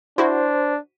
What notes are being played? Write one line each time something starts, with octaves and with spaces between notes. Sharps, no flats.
D4 E4 F#4 C5